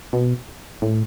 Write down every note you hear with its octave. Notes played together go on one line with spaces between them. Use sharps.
B2
A2